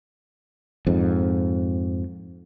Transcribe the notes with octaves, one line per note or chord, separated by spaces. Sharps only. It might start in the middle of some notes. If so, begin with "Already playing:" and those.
F2 G#2